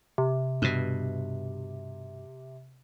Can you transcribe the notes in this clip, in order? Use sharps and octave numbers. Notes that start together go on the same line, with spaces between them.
C3
G2 B2